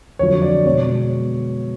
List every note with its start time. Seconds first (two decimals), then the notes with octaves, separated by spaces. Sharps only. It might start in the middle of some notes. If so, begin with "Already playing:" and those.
0.19 F2 D3 F#3 C#5
0.42 D5
0.66 B2 G#3 B3 C#5